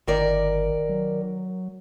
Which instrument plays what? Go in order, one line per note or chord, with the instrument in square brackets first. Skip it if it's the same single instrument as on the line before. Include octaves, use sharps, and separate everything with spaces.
[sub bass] G1 [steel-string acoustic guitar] D#3 A#4 D5
[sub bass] F#3